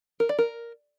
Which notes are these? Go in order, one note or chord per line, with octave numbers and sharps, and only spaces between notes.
A#4
D5
A#4